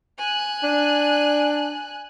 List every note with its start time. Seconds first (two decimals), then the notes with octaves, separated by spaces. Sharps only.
0.19 G#5 F#6
0.63 D4